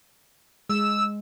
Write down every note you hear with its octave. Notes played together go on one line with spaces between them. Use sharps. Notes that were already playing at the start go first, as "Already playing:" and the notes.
G#3 E6